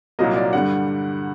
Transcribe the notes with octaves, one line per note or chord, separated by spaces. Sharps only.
C2 A#2 F#3 A#3 D#5
D5
G2 D3 G3 F#5